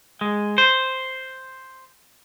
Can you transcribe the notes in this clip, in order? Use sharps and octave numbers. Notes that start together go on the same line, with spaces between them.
G#3
C5